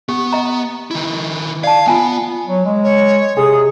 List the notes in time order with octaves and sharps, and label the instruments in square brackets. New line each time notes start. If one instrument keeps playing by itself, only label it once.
[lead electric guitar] B3 [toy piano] G4
[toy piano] D#5 A#5
[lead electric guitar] D#3 E4
[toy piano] D5 A5 [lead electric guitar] F5
[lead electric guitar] B3 [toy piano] F4 G#5
[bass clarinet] F#3
G#3
[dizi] C#5
[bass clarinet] C3 [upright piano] G#4 [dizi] D#6